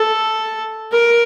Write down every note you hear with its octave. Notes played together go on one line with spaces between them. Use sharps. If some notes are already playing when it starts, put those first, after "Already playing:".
Already playing: A4
A#4